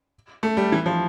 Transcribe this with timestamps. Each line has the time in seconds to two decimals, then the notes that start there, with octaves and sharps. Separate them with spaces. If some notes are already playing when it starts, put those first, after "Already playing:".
0.43 A3
0.57 G3
0.72 E3
0.86 F3